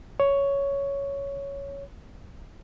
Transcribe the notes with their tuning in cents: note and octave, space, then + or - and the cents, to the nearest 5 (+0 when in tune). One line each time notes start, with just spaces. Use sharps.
C#5 +10